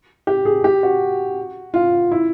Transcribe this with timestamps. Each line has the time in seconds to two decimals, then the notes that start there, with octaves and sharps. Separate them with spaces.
0.27 G4
0.45 G#4
0.64 G4
0.83 F#4
1.74 F4
2.12 E4